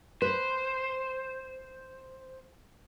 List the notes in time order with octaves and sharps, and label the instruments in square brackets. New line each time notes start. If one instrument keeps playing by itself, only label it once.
[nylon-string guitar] B4 [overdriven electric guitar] C5